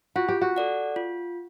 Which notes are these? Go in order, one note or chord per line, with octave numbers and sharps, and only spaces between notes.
F4 F#4
G4
F#4
A4 D5 F#5
F4